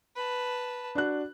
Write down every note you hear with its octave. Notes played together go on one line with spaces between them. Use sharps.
B4 A5
D4 F#4 F#6